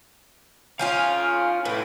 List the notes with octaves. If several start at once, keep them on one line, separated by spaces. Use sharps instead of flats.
F3 C#4 F4 F5 G#5
A2 E4 B4